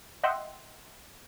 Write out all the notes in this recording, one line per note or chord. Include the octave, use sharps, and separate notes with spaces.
D#5 E5 F#5 G5 C6